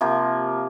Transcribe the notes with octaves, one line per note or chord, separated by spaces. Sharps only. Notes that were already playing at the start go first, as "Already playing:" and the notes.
C3 F3 A#3